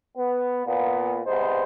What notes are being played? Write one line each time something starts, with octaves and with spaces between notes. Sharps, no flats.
B3
A#2 B3
C2 G#2 B3 D#4 C5